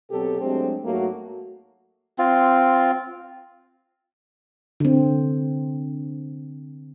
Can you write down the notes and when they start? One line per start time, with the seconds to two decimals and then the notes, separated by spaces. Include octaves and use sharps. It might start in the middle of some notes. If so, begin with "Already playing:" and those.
0.11 B2 F#3 C4 G4 A4
0.41 F#3 G#3 A3 C4 D4 G4
0.85 G#2 F#3 A3 A#3 F#4
2.18 C4 F4
4.80 D3 C4